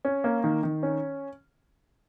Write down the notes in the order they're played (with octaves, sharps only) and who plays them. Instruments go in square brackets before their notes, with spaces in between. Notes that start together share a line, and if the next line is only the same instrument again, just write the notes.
[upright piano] C#4
A#3
D#3
D#3
C#4